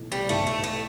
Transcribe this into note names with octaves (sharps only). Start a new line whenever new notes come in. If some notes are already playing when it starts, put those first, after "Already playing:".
Already playing: B1 A2 E3
G3
B1 A2 E3 A3
A3
A3